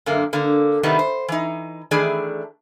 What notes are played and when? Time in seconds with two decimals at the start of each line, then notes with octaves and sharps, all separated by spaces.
0.06 F#2 D3 A#3
0.33 D3 A#3
0.83 C3 D#3 G3 B3 D#4
0.99 C5
1.28 E3 D#4
1.91 D#3 E3 A3 D4 G#4 D5